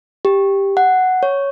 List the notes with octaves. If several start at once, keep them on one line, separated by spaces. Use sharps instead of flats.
G4
F#5
C#5